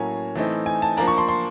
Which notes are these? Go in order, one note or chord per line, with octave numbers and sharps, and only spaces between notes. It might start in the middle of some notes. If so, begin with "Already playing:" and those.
Already playing: A2 F#3 A#3 C#4 G#5 A#5
E3 A3 C4 D#4
G#5
A5
F3 A#3 D4 A#5
C#6
C6
C6